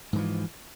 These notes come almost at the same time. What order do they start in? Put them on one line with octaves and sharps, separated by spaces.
G#2 E3 F3